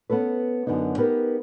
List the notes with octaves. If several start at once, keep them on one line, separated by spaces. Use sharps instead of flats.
B3 C#4 A4 B4
F#2 D3 B3 D4 D#4
B3 D#4 G4 A#4 B4